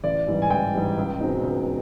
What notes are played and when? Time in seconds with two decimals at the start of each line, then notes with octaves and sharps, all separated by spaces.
0.04 A1 D5
0.27 G#2 E3 G3
0.42 G#5
0.50 A1 G5
0.74 G#2 E3 G3
0.97 C#2
1.21 B2 G#3 C4 D#4
1.43 C#2